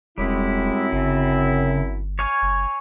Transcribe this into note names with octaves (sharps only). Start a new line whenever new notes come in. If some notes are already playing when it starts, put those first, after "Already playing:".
E1 F#2 G3 G#3 C4 E4
G1 C#3
C#5 F5 G#5
F#1